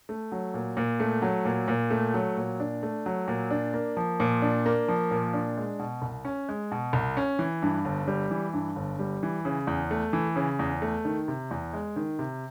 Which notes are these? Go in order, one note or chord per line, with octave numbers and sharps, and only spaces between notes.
A3
F#3
A#2
A#2
A3
F#3
A#2
A#2
A3
F#3
A#2
D4
A3
F#3
A#2
D4
A#3
F3
A#2
D4
A#3
F3
A#2
D4
G#3
B2
C2
C#4
G#3
B2
C2
C#4
E3
G2
G1
G3
E3
G2
G1
G3
E3
C#3
E2
A3
E3
C#3
E2
A3
D#3
C3
E2
G#3
D#3
C3